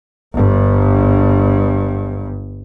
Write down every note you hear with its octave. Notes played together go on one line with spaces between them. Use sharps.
G1 G2